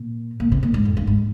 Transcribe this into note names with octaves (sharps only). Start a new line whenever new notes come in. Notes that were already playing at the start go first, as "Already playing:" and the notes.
Already playing: A#2
A#2
C3
A#2
G#2
F2
G2
G#2